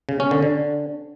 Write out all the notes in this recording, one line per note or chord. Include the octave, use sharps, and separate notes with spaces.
C#3
C#4
D3
D3